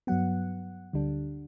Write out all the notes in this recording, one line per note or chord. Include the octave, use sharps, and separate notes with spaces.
G2 F#3 B3 F#5
D2 D3 G3 D4